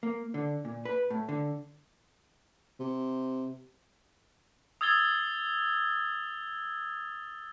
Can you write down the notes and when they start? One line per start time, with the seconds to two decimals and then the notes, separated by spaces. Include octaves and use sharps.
0.03 A#3
0.34 D3
0.65 A#2
0.85 B4
1.10 A2
1.29 D3
2.80 C3
4.81 D#6 E6 G#6 A6 G7